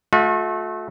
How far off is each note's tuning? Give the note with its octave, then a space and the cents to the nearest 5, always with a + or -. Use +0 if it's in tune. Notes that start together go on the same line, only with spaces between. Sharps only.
A3 -25 F#4 -45